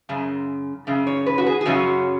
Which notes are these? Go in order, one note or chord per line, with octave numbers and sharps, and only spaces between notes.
F#2 C#3
F#2 C#3
C#5
B4
F#4
G#4
G#4
F#2 C#3 F#3 C#4 F#4